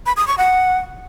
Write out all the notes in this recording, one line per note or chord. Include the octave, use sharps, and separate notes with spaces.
B5
D#6
C#6
F#5